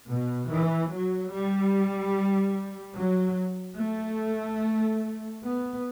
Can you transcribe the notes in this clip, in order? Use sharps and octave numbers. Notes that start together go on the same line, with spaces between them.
B2
E3
F#3
G3
F#3
A3
B3